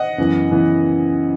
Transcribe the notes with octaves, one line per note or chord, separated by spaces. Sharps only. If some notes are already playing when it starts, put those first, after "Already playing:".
Already playing: D#5 F#5
F#2 C#3 E3 B3
C#3 E3 B3